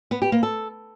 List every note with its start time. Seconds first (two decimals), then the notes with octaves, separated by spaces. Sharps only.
0.11 B3
0.22 G4
0.32 A#3
0.43 A4